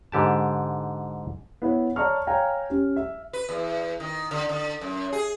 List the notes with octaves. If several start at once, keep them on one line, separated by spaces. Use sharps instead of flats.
G#2 D3 G4 A5
B3 E4 B4 C#5
C#5 D5 A5 A#5 C#6 F6
C#5 F5 G5 G#5 A#5
C#4 G4
E5
B4
E2
D#3
D3
D3
F#2
G#4